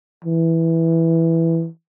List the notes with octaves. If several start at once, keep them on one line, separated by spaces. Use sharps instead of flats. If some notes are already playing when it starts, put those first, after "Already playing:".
E3